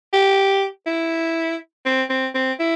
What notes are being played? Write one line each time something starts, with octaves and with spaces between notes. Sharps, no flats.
G4
E4
C4
C4
C4
E4